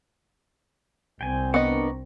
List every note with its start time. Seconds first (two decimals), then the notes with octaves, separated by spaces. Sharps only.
1.21 C2 C4 G5 G#5
1.54 B3 D4 A#4 D#5 C#6